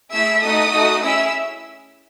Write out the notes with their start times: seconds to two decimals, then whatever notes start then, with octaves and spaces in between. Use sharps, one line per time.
0.11 A3 E4 G#4 E5 E6
0.41 A3 D#4 F#4 A4 D#5 D#6
0.72 A3 D#4 F#4 A4
1.02 C#4 E4 G#4 E5 E6